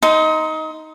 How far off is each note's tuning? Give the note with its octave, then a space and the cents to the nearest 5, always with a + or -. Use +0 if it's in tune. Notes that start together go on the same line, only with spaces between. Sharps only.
D#4 +15 C6 -15 D#6 +35